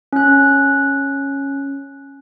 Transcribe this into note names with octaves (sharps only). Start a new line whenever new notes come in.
C#4 F#6